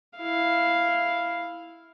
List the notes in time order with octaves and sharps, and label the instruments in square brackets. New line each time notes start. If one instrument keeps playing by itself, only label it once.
[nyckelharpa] E4 F5